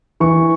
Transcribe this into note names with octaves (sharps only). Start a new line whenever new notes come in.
E3 C#6